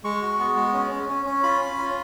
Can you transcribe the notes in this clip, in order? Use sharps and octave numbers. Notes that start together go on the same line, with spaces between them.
G#3 C#6
F#4
B3
G#3
C#4
C#4
C#4
C#4
F4 B5
C#4
F4